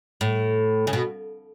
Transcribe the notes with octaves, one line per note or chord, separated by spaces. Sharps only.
A2
C#3
B2